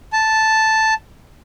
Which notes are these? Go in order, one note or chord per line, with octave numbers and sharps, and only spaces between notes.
A5